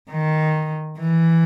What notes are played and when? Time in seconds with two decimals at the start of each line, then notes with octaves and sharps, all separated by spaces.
0.10 D#3
0.98 E3